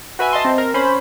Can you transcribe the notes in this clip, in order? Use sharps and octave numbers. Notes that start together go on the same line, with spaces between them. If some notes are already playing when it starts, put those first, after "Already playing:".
F#4 B4 E5 G#5
D#5 A5 C6
C4
A#4
C#4 C5 B5